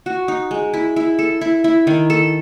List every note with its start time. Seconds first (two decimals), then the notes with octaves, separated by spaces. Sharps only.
0.06 F#4
0.28 D#4
0.51 G#3
0.74 E4
0.96 E4
1.19 A4
1.41 E4
1.64 E4
1.87 D#3
2.10 A4